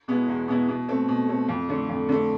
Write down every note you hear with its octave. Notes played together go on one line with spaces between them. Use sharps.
B2 G#3 B3 E4
E2
B2 G#3 B3 E4
B2
A3 C4
B2
A3 C4
F2
D3 A3
F2
D3 A3